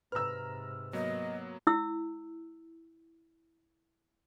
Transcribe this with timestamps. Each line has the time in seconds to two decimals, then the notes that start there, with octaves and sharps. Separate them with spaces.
0.12 G#2 C3 B4 A#5 E6 F6
0.93 F#3 A#3 B3 D#5
1.67 E4 E6